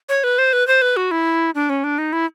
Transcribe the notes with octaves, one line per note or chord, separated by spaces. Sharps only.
C#5
B4
C5
B4
C5
B4
F#4
E4
D4
C#4
D4
D#4
E4